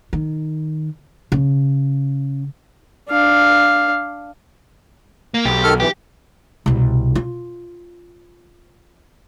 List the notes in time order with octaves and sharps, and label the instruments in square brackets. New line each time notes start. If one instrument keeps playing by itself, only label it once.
[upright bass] D#3
C#3
[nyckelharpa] D4 F5
[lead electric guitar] A#3
[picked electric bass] B1 [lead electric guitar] G4
[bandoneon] D#3 A4 F6
[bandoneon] E3 [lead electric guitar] G4
[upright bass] C2 B2
F4